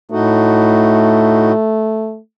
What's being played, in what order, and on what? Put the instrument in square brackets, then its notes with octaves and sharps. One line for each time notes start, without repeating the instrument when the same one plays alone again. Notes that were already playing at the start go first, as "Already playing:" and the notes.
[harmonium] A2 D#4 F#4 [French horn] A3